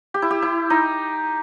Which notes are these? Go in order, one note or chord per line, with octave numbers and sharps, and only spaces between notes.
G4
E4
G4
E4
D#4